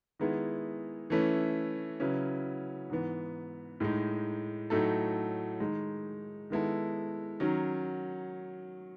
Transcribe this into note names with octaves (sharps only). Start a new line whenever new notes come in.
D#3 G#3 B3 E4 G#4
E3 A3 C#4 E4 B4
C#3 F#3 C#4 E4 B4
G#2 E3 B3
A2 G#3 D#4
A2 F#3 A3 D#4 A4
D#3 G#3 D#4
D#3 G#3 B3 E4 A4
D#3 F#3 C#4